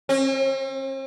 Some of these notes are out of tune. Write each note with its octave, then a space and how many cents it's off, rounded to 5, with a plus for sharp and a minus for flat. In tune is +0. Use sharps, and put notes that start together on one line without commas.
C4 +45